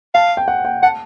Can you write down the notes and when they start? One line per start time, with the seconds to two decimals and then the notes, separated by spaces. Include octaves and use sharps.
0.14 F5 A5
0.37 G5
0.48 F#5
0.65 G5
0.83 F#5 A5